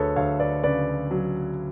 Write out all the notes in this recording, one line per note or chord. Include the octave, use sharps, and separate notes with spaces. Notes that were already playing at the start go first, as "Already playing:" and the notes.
Already playing: D2 G#4 A4 B4 C#5
D2 C#5 F5
B4 D5
C#3 B4 D5
F#3